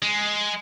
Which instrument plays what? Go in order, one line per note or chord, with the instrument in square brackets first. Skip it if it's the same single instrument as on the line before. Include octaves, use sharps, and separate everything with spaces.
[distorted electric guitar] G#3